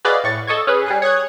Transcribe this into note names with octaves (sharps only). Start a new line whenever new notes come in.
F#4 G#4 B4 D5 D#5 F5
A2 C#6 A6
A4 D#5 C#6 G#6
C#4 G#4 B4
G3 G#4 F#6
C#5 D#6 F#6 G#6